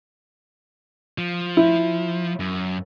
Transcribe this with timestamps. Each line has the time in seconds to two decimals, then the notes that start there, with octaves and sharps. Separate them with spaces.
1.18 F3
1.57 E4
2.40 F#2